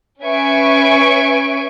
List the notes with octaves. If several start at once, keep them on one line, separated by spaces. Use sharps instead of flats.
C#4 B4 E5 G#5 C#6 D7